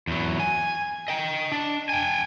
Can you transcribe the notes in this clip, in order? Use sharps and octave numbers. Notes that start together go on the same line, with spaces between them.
E2 F#3
G#5
D#5 G5
D4
G5 G#5